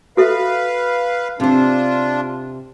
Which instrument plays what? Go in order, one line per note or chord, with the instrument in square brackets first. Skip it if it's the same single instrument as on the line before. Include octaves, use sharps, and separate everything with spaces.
[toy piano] F#4 A4 E5 [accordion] B4 F5
[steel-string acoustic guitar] C3 C5 [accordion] D4 F4